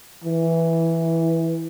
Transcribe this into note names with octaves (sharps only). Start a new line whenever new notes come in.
E3